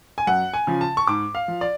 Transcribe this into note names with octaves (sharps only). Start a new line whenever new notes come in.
G#5
F#2 F#5
G#5
C#3 F3
A5
C#6
G#2 D6
F5
F3
D5